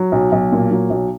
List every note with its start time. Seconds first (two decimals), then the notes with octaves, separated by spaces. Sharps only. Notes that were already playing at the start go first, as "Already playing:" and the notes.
Already playing: F#3
0.12 B1
0.32 B1
0.52 A#2
0.71 F#3
0.90 B1